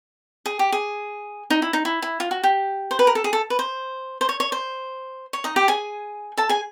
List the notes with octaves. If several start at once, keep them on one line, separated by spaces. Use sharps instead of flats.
G#4
G4
G#4
D#4
E4
D#4
E4
E4
F4
F#4
G4
C5
B4
A#4
A4
G#4
A4
B4
C5
C5
C#5
C#5
C5
C#5
D#4 D#5
G4 G5
G#4 G#5
A4 A5
G#4 G#5